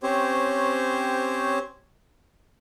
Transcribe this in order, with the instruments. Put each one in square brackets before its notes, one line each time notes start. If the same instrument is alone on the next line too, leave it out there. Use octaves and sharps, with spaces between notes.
[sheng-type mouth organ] C4 C#4 G4 C5 C#5